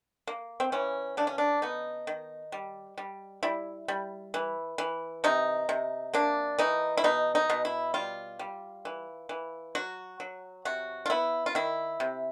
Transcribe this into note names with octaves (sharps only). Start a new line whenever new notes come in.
A#3
C4
E3 C#4
C#3 D4
C#4
D4
B3 D#4
D#3
G3
G3
G3 E4
G3
E3
E3
C3 D#4
C3
A#3 D4
E3 D#4
E4
B2 D#4
D#4
B2
E4
G3 F4
G3
E3
E3
F#3 F#4
F#3
C3 F#4
F4
B3 E4
F4
D#3 E4
C3